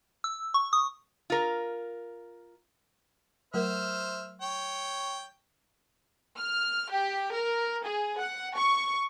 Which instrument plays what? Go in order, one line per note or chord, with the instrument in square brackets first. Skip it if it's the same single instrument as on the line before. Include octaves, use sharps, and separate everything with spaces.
[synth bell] E6
C#6
D#6
[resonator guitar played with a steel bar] F4 A#4
[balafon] F#3 A3 A#4 [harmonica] C5 E5 F6
[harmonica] C#5 G5
[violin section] F6
G4
A#4
G#4
F#5
C#6